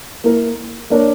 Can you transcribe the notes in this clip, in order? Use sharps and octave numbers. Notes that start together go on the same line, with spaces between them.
A#3 E4 A#4
A#3 D4 A#4 C#5